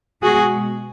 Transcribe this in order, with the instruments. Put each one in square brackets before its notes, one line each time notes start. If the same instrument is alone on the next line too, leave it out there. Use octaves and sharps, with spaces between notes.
[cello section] B2 G#3 F#4 G#4